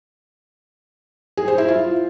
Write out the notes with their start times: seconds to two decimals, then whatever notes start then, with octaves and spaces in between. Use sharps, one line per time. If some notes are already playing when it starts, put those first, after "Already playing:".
1.37 G#4
1.48 C5
1.58 E4
1.68 F4